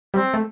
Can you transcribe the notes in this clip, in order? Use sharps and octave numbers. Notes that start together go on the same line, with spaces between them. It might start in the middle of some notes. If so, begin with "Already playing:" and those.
G3 C4
A3